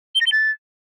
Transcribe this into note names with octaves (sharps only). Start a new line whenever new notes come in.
G7
A#6
G7
A6